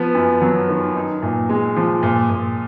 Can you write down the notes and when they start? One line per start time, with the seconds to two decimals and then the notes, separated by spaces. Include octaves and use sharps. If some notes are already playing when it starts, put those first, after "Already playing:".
Already playing: F3 B3
0.15 F#2
0.41 F#3
0.68 D#3
0.95 D#4
1.23 A#2
1.49 G#3
1.76 F3
2.03 A#2
2.29 A#2